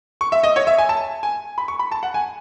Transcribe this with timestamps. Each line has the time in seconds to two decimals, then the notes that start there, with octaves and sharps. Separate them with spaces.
0.21 C#6
0.32 E5
0.43 D#5
0.56 C#5
0.67 E5
0.78 G#5
0.89 A5
1.23 G#5
1.58 B5
1.68 C#6
1.79 B5
1.92 A5
2.03 F#5
2.14 G#5